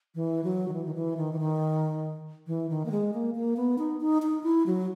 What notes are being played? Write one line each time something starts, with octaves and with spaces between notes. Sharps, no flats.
E3
F#3
D#3
E3
D#3
E3
D#3
E3
D#3
E3
D#3
A#3
G#3
A#3
A#3
B3
D#4
D#4
D#4
E4
F#3